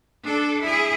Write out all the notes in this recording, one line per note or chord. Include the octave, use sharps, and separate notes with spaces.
D4 A4
E4 G#4